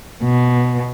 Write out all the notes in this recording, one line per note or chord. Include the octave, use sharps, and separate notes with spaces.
B2